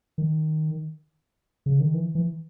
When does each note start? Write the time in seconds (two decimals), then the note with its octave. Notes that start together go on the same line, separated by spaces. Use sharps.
0.18 D#3
1.66 C#3
1.80 D#3
1.94 E3
2.15 E3